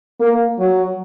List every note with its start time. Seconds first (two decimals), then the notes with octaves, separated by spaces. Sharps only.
0.20 A#3
0.59 F#3